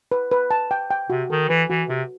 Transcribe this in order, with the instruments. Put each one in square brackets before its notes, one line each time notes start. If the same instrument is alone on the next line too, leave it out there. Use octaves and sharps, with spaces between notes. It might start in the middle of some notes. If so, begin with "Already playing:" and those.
[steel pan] B4
B4
A5
G5
G5
[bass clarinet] C3 [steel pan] F#4
[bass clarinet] D#3 [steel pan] A4
[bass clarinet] E3 [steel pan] B4
[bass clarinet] E3 [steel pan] F#4
[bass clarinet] C3 [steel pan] F#4